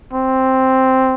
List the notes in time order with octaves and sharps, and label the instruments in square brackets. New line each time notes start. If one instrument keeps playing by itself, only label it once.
[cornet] C4